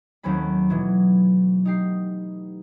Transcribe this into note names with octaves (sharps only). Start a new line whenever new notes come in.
D#2 F#3 A3 C4 C#4 B5
B2 E3 F#3
D#4 G4 C7